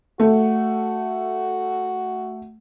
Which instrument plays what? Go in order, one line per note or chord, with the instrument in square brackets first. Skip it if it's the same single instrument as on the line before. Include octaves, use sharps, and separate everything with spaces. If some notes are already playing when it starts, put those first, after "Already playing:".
[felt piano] A3 [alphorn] F#4